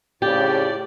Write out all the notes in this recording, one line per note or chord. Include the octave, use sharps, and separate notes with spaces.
F2 A2 C#3 G4 D5